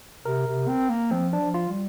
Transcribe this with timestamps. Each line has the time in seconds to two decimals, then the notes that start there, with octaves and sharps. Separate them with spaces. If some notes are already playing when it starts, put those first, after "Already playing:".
0.25 C3 A#4
0.47 C3
0.68 C4
0.90 A#3
1.11 F3 C4
1.33 D4
1.41 F3
1.54 F4
1.69 G3